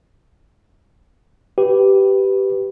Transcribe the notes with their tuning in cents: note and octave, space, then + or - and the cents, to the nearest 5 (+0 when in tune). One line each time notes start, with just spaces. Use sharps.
G4 -10 B4 +0